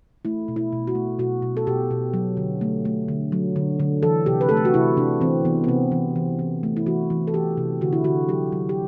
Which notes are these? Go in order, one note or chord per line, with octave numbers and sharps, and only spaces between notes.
A3 E4
B2
E4
B2
F#4
A3
B2 F#4
B2
A4
B2 G4
B2
F#3
D3
A3
A3
D3
F#3
D3
D3
E3 A4
C3 G4
B4
A3 A4
G4
F#4
C3 E4
C3 D4
E3 C4
E3 B3
B3
C3 C4
E3
E3
E3
A3
E4
E3 F#4
E3
A4
E3 G4
C3
D3 F#4
E4
D3 F#4
F#3 G4
F#3
G4